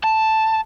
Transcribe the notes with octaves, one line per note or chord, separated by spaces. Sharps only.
A5